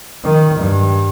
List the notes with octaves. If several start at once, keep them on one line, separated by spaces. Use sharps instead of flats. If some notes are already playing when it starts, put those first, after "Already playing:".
D#3
G2